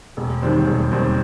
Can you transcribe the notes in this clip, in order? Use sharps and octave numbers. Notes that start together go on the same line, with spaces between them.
E1
D#2 D#3 G3 C4
E1
D#2 D#3 G3 C4